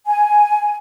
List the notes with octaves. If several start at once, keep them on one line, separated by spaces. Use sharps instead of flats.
G#5